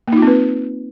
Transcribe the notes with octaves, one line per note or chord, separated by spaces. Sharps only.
A#3 C4 D#4 F4 B4